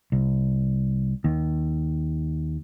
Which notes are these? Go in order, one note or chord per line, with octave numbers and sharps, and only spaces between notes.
C2
D#2